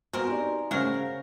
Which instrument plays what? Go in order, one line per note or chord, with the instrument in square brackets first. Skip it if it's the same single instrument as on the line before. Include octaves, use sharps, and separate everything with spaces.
[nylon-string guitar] B3 F#4 [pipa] C4 A#4 [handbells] G#5 A#5 C6
[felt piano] D#4 G4 D5
[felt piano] C#3 F6 [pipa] F#3 F#4 A#4 [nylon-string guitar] A3 [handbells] C#4 C5
[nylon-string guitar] F5